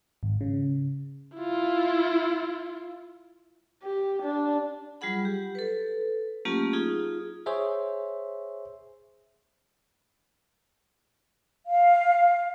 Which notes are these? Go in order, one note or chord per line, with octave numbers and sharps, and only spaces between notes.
G#1
C#3
E4 F4
G4
D4
F#3 G3 F4 G#4 F#5 B5
G4
A4 B4
F#3 A3 A#3 C#4 F4 G4
D#4 F4 G#4
G#4 C5 C#5 E5
F5